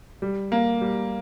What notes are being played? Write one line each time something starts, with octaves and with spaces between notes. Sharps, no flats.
G3
A#3
G3